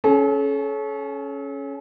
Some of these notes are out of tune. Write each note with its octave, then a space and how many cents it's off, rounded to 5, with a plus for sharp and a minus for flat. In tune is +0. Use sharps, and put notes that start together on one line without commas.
C#4 +0 A4 -40